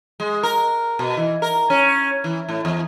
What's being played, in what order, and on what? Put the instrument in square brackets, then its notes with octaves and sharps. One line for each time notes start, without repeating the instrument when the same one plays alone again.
[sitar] G#3
A#4
B2
E3
A#4
C#4
E3
A2
E2